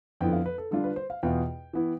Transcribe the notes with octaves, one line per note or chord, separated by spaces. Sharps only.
F2 D3 F3 B3 E4 G5
F5
B4
A4
D3 G3 D4 F4 A4
B4
C5
F5
E2 B2 B3 F4 G5
E3 B3 E4